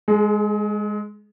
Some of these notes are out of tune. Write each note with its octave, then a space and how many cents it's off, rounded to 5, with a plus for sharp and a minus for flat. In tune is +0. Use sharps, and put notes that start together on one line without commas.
G#3 +0 G#4 +40